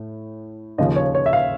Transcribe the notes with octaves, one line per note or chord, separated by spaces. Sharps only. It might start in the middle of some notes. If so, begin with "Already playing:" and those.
Already playing: A2
D#2 C#3 F3 D#5
C#5
C#5
E5
F5